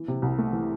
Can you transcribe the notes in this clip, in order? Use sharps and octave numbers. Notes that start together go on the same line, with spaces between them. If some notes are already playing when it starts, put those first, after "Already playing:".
Already playing: E3
C3
C2
A3
E3